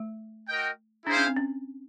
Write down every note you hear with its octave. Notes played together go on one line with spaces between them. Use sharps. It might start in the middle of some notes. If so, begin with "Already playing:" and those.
Already playing: A3
F#4 A#4 D#5 G5
D4 E4 G#4 C5 F5
C#4
C4
C#4